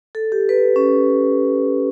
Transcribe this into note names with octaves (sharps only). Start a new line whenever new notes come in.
A4
G4
B4
C#4